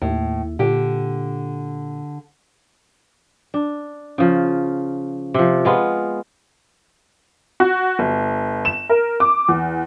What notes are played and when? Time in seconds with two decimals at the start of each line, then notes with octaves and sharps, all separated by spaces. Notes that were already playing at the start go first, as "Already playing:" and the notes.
0.02 D#2 A2
0.59 A#2 D3 G4
3.54 D4
4.18 C#3 F3
5.34 C3 F3
5.65 G#3 B3 F4
7.60 F#4
7.99 G1
8.65 E7
8.89 A#4
9.20 D6
9.49 E2